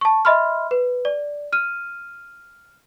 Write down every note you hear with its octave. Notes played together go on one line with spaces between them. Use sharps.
A5 C#6
D#5 E5 B5 C6 F6
B4
D5
F6 D#7